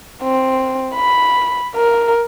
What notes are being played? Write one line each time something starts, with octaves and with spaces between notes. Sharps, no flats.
C4
B5
A#4